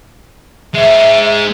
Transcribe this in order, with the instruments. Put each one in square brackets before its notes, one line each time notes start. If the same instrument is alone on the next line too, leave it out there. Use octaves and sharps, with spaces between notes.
[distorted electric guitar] G#3 D#4 [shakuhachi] E5